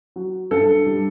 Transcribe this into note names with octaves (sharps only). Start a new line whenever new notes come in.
F#3
G2 A4
G3